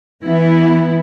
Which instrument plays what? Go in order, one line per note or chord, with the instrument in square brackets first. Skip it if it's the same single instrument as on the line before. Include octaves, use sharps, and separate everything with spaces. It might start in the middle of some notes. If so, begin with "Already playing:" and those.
[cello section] E3 B3 E4